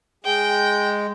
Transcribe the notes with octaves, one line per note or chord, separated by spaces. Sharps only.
G#3 G5